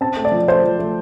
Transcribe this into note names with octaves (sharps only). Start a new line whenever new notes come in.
C4 A5
A3
D5
F3
A3 C5
F3
A3